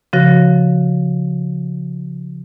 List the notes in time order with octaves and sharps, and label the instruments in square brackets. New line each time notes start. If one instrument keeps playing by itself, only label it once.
[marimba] C#3 F3 F#4 A#6